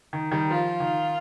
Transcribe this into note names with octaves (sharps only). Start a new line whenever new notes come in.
D#3
D#3 G3
F3 F4
D#3